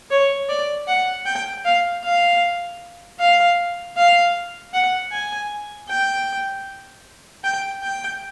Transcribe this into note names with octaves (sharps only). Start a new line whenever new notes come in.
C#5
D5
F#5
G5
F5
F5
F5
F5
F#5
G#5
G5
G5
G5